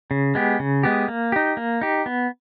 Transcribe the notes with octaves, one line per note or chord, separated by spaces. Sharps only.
C#3
G#3 B3 G4
C#3
G#3 B3 G4
A#3
D#4 G4
A#3
D#4 G4
B3